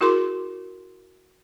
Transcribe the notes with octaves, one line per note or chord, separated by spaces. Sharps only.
E4 F#4 G#4 A#4 C6 D6